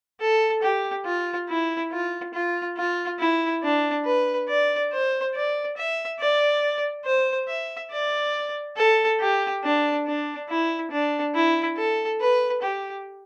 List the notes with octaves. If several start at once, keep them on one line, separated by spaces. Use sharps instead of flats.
A4
G4
F4
E4
F4
F4
F4
E4
D4
B4
D5
C5
D5
E5
D5
C5
E5
D5
A4
G4
D4
D4
E4
D4
E4
A4
B4
G4